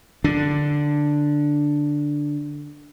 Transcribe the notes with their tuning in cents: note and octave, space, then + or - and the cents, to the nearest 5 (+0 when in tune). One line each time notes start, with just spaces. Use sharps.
D3 +0 D4 +0